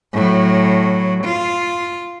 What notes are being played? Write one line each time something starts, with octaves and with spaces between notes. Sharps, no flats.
A2 F#3
F4